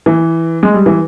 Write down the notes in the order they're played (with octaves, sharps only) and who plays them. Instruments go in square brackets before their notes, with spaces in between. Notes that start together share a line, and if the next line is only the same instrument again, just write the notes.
[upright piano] E3
G#3
G3
E3